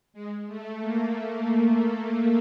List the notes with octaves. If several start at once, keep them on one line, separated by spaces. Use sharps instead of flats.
G#3
A3
A#3